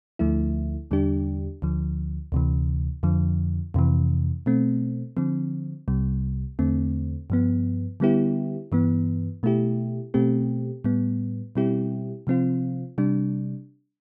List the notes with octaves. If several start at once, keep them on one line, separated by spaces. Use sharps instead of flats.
D2 D3 F3 A3 E4
E2 D3 G3 D4 G4
D2 D3 F3
D2 C3 E3
F2 D3 F3
F2 C3 E3
B2 A3 C4
D3 F3 C4
C2 C3 G3
E2 D3 A3 C4
G2 F3 B3
D3 G3 B3 E4 G4
G2 E3 B3
B2 A3 E4 G4
B2 A3 C4 G4
A2 G3 B3
B2 G3 C4 E4 G4
C3 F3 C4 F4
C3 G3 D4